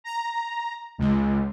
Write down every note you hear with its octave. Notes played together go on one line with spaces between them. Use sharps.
A#5
C#2